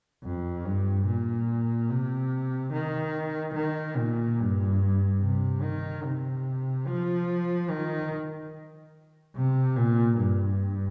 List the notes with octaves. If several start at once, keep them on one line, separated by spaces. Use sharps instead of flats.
F2
G2
A#2
C3
D#3
D#3
A#2
G2
C3
D#3
C3
F3
D#3
C3
A#2
G2